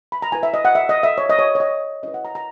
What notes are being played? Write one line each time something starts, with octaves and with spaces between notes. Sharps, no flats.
B5
A#5
E4 B4 G#5
E5
D#5
F#5
E5
D#5
E5
C#5
D#5
C#5
C#5
D#5
C#4 E4 B4 D#5
F#5
A#5
A#5